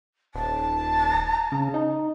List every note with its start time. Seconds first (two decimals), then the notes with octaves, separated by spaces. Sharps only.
0.35 D#1 A5
1.52 C#3
1.74 D#4